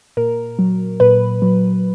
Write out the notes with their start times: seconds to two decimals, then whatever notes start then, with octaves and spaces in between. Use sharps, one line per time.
0.17 A#2 A#4
0.59 F#3
1.00 A#2 B4
1.42 F#3